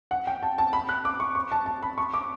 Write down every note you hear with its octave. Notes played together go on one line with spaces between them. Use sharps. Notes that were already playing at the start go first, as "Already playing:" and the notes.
F#5
G5
A5
A5
B5
F#6
D6
C#6
C#6
A5
A5
B5
C#6
D6